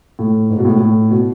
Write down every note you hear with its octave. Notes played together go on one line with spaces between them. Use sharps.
A2
G#2
B2
A2
A2
B2